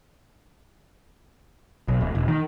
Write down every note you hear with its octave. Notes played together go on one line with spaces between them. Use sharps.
B1
D1
E1
D#3